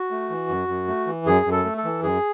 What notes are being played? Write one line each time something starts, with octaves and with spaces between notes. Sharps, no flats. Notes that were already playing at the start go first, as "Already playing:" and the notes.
Already playing: F#4
A3
E3
F#2
F#2
A3
E3
F#2 G#4
F#2
A4
A3
A4
E3
F#2 G#4